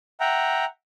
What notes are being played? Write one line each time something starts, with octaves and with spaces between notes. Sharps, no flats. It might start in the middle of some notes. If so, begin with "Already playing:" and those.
E5 F#5 G5 A#5